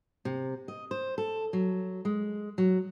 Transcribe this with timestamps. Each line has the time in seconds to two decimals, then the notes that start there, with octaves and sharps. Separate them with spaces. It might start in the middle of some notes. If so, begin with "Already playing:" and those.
0.25 C3
0.68 D#5
0.91 C5
1.18 A4
1.53 F#3
2.05 G#3
2.58 F#3